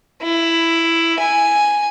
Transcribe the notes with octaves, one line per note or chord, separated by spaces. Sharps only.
E4
G#5